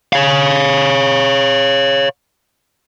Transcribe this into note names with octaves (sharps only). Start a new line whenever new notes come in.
C#5 F5